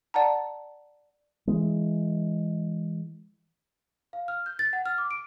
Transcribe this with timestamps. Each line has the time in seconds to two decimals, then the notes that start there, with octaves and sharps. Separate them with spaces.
0.14 D5 F#5 A5 A#5
1.47 E3 G#3
4.13 F5
4.28 F6
4.46 G6
4.59 A6
4.73 F#5
4.86 F6
4.98 D6
5.11 D7